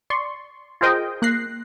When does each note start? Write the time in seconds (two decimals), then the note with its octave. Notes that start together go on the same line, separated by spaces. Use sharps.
0.10 D5 C6 C#6
0.81 F4 G#4 A#4 C5 D#5 G5
1.22 A#3 F#6 A#6 C7